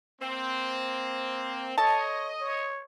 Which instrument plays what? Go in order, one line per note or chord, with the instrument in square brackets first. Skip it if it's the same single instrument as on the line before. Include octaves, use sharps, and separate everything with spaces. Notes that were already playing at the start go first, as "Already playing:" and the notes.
[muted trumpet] A#3 [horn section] C4
[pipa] A4 A5 [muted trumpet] C#5 [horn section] D#5
[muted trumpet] C#5